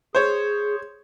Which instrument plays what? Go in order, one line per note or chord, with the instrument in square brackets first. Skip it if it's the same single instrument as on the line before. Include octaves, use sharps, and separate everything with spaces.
[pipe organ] G#4 [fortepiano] C5 C#5